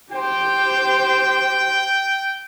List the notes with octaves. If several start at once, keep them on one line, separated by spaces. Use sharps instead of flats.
G4 C5 G5